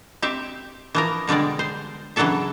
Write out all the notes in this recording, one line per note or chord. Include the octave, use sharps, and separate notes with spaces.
C4 G4 E5
E3 F3 A#4
B2 D3 G3 G#3 D5
C5
C#3 E3 F#3 D4 A4 E5